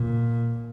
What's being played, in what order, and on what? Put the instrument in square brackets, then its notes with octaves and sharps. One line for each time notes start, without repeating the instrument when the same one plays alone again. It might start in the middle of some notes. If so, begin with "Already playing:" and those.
Already playing: [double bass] A#2